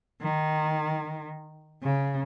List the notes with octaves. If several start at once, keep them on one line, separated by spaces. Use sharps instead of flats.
D#3
C#3